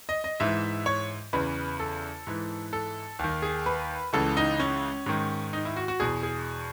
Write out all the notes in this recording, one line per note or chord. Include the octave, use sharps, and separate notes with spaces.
D#5
D#5
G#2 E3 E5
C#5
E2 C#3 E3 B4
A4
G#2 E3
A4
D#2 D#3
G#4
B4
C#2 C#3 E3 A4
D#4
C#4
G#2 D#3
D#4
E4
F#4
F#4
E2 B2 G#4
G#4